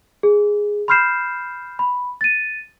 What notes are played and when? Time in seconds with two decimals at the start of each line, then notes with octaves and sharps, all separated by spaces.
0.23 G#4
0.88 B5 C6 F6 G6 C7 E7
1.79 B5
2.21 A6 D#7